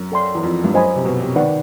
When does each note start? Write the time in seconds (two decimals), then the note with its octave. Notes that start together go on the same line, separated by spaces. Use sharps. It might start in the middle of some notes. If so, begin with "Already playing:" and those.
Already playing: F#2
0.12 A4 D5 G5 C6
0.35 E2
0.43 F2
0.64 G2
0.74 F#2 C5 D#5 G#5 B5
0.96 C3
1.05 B2
1.21 C3
1.36 D#3 B4 D5 F#5